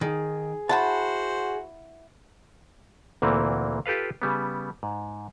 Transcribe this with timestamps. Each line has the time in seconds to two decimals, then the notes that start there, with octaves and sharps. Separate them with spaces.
0.01 D#3 G#4
0.69 E4 F#4 C5 F#5 A5 B5
3.22 D2 A#2 E3 A#3 C4
3.86 F4 G4 A4 B4 F5
4.22 C#3 G3 B3
4.83 G#2